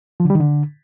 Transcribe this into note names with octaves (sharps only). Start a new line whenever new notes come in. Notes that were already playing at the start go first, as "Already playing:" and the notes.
F3
D3
G3
D#3
D3